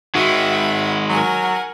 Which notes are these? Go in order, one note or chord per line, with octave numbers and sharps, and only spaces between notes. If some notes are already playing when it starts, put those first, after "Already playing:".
D#3 G#3 F#4 E5 F#5 B5
F#3 A#4 F#5 G#5